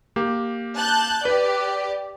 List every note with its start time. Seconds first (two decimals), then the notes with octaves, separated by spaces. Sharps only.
0.16 A#3 G4
0.76 A5 F#6 G6
1.25 G4 B4 D5